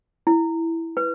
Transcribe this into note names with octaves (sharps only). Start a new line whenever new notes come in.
E4
B4